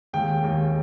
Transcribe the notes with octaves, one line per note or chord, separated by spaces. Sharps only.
D#2 D#3 G#3 G5
D#2 D#3 G#3